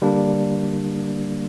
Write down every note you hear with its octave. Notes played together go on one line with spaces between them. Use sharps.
D3 G3 A#3 D4